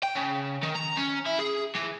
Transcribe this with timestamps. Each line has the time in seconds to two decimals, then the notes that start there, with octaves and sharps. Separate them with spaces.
0.03 G5
0.15 C#3
0.62 D#3
0.75 A#5
0.97 C#4
1.26 E4
1.40 G#4
1.76 E3